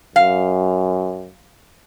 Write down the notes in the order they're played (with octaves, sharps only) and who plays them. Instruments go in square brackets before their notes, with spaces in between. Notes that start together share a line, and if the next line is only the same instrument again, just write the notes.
[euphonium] F#2 [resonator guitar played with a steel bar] F5